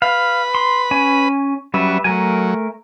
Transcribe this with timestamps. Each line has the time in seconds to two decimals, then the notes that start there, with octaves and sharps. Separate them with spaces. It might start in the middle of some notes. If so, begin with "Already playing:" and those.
0.02 B4 F5 B5
0.55 C6
0.91 C#4 G#5
1.74 F#3 G3 C#4 B4 E5
2.04 F#3 A3 A#4 G#5